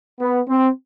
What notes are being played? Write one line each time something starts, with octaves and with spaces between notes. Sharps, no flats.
B3
C4